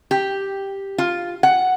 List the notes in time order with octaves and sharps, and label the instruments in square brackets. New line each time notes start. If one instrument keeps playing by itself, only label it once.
[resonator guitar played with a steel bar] G4
F4
F#5